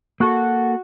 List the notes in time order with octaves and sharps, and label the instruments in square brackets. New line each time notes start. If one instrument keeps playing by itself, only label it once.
[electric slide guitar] A#3 A4 [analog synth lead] F#4